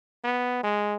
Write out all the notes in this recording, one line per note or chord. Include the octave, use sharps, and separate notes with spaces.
B3
G#3